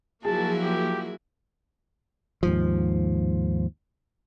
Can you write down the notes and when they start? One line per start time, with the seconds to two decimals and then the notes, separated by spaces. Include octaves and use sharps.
0.25 F3 F#3 A#3 E4 F#4 G#4 A5
0.63 G4
2.43 D#2 G#2 F3